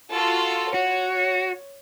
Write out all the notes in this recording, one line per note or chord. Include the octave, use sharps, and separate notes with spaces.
F4 F#4 A4
F#4 C#5